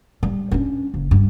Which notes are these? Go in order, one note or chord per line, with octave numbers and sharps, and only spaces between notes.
G3
C#4 D4
F#1
G2